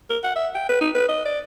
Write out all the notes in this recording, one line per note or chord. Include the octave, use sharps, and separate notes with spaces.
A#4
F#5
E5
G5
B4
D#4
B4
D#5
D5